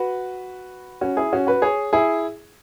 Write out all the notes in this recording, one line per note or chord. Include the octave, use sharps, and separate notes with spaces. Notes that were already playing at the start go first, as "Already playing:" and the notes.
Already playing: F#4 B4
C#4 F#4
E4 G#4
C#4 F#4
F#4 B4
G#4 C#5
E4 G#4